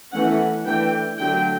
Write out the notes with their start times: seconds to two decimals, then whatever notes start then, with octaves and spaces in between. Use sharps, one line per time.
0.13 E3 A3 C#4 F#5
0.66 E3 A3 D4 G5
1.18 D3 F#3 A3 G5